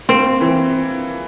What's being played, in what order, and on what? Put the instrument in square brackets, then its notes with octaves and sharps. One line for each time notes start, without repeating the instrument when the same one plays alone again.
[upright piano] A#3 [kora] C4
[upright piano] E3